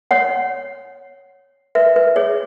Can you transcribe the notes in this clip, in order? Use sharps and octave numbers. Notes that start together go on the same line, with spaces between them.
C#5 F#5
B4 E5
B4
G#4 C#5